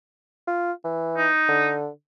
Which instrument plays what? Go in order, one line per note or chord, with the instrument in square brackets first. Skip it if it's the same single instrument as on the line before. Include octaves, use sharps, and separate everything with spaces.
[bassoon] F4
E3
[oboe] D#4
[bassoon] D3